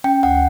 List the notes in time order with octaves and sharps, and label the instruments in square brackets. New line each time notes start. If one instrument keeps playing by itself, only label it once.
[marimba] C#4 [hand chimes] G5
[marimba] D2 [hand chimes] F#5